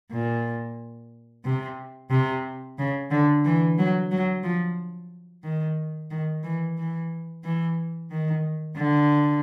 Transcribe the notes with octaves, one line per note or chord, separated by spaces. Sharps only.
A#2
C3
C3
C#3
D3
E3
F#3
F#3
F3
D#3
D#3
E3
E3
E3
D#3
D3